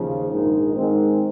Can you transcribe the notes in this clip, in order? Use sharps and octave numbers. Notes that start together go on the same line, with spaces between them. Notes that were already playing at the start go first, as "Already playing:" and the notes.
Already playing: D#2 C#3 F3
A#1 G#2 D#3 G#3 D#4
G#2 D#3 G#3 C4